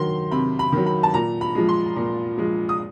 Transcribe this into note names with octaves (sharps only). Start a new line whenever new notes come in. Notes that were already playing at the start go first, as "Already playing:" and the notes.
Already playing: D#3 F#3 C6
C3 B5
B5
D#3 F#3
B5
A5
A#2 A#5
B5
F3 G#3
C6
A#2
F3 G#3
D#6